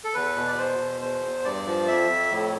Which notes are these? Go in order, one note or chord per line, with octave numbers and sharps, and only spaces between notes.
A4
E2 B4
B2
D5
E2 C5
B2
E2 C5
E2
G2 D5
F3
F2 E5
F2
A2